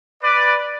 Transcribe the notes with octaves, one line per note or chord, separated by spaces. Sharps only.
B4 D5